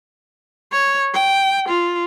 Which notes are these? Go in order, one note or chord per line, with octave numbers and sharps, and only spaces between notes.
C#5
G5
F4